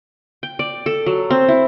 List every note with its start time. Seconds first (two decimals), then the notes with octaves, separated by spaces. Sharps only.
0.43 G5
0.59 D5
0.86 A4
1.06 F#3
1.30 C4
1.48 E4